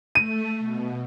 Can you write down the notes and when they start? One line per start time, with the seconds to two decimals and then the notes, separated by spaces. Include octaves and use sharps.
0.15 A3 D#7
0.59 B2